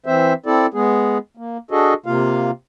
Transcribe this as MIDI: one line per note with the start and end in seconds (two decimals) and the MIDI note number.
0.06 0.33 52
0.06 0.33 60
0.06 0.33 72
0.06 0.33 76
0.46 0.66 60
0.46 0.66 64
0.46 0.66 69
0.46 0.66 74
0.74 1.18 56
0.74 1.18 59
0.74 1.18 68
1.37 1.58 58
1.71 1.94 62
1.71 1.94 66
1.71 1.94 68
1.71 1.94 69
1.71 1.94 75
2.06 2.51 48
2.06 2.51 58
2.06 2.51 65
2.06 2.51 77